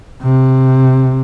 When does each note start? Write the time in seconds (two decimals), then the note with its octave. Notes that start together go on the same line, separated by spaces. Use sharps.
0.22 C3